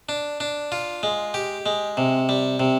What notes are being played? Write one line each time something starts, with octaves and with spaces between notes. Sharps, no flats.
D4
D4
F4
G#3
G4
G#3
C3
G3
C3